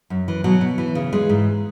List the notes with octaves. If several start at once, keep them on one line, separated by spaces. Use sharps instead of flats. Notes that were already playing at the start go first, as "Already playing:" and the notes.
F#2
E3
B2 F#3
B2
E3
C#3
E3 G#3
G#2